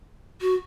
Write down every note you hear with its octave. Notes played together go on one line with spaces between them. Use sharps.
F#4